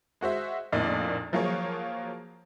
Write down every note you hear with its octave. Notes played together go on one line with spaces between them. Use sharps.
G#3 F#4 C5 E5
A#1 F2 A2 A#3 D#4 D5
F3 F#3 A#3 F4 G#4 C#5